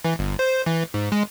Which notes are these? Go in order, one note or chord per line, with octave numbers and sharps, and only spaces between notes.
E3
G1
C5
E3
G#2
G#3